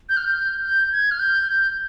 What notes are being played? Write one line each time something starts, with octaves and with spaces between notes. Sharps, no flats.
G6
F6
G6
G6
G6
G#6
F6
G6
G6